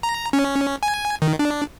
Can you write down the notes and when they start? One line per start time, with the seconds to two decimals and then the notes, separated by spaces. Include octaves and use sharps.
0.03 A#5
0.33 C#4
0.83 G#5
1.22 D#3
1.39 D4